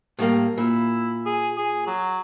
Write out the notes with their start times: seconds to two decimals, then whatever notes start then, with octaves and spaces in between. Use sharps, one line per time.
0.19 A2 G3 A#3
0.58 A#2 E4
1.26 G#4
1.57 G#4
1.87 F#3